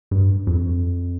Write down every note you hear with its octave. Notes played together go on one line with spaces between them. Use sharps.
G2
F2